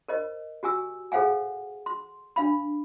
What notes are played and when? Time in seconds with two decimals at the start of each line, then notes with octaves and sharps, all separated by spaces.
0.08 A#4 C5 D#5
0.63 F#4 G4 G#5 E6
1.12 G#4 A4 C5 F5 F#5 G#5
1.86 C6
2.36 D4 F5 B5